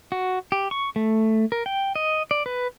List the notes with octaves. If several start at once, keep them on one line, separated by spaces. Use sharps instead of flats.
F#4
G4
C#6
A3
A#4
G5
D#5
D5
B4